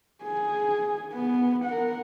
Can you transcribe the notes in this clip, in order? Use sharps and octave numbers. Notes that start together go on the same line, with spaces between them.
G#4
B3
A#4 F#5